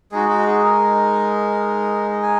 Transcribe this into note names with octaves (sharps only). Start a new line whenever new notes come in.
G#3 D#4 F#4 G#4
F#4
G#4
A#4
G#5